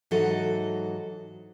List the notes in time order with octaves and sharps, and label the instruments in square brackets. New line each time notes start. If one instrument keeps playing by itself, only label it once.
[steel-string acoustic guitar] G#2 E3 F#3 D#4 F#4 A4